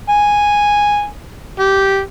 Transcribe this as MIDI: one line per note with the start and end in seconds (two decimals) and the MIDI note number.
0.09 1.05 80
1.60 2.00 67